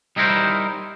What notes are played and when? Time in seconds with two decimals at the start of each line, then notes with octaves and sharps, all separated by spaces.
0.16 G3 D#4 E4 A#4 C5